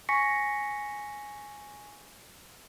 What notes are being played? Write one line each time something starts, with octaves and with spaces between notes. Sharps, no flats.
G#5 C#6 A#6 B6 C#7